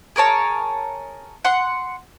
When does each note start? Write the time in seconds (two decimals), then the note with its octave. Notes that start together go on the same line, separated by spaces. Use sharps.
0.16 G#4 A#4 C#5 A5
1.45 F#5 C6